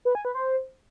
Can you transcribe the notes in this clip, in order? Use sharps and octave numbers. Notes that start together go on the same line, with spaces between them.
B4
G#5
B4
C5